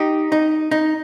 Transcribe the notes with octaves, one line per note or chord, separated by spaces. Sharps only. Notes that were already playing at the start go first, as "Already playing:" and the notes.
Already playing: D#4 G4
D#4
D#4